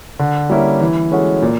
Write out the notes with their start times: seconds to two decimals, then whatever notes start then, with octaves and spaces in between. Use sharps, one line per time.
0.19 D3
0.50 G3 A#3 C#4 E4
0.81 E3
1.12 G#3 C#4 F#4 A4
1.42 A#2